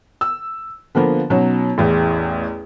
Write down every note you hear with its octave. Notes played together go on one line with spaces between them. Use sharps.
E6
D3 F3 A#3 B3
B2 F#3 C#4 D#4
A1 E2